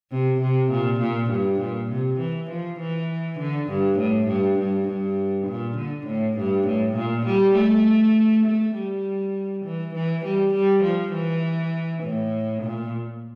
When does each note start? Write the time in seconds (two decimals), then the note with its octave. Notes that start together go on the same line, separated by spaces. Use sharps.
0.11 C3
0.41 C3
0.71 A#2
1.00 A#2
1.30 G2
1.60 A#2
1.90 C3
2.20 E3
2.50 F3
2.80 E3
3.39 D3
3.69 G2
3.99 A2
4.28 G2
4.59 G2
4.88 G2
5.47 A#2
5.77 D3
6.07 A2
6.37 G2
6.67 A2
6.96 A#2
7.26 G3
7.57 A3
8.46 A3
8.75 G3
9.65 E3
9.94 E3
10.24 G3
10.54 G3
10.83 F3
11.13 E3
12.03 A2
12.63 A#2